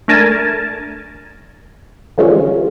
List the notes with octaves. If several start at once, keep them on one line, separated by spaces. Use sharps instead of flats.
A3 D4 A#4 G#5 A5
D3 E3 F3 G3 G#3 C#4